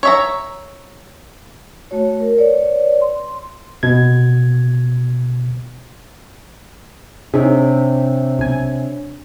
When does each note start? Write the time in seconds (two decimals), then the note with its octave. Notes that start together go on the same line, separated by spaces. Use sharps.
0.03 C#5 E5 A#5
1.91 A3 F#4 C#5
2.20 A#4
2.38 B4 C#5 D5
3.02 C6
3.83 B2 G#6
7.34 C3 D4 D#4 G#4 C#5
8.39 B1 G#5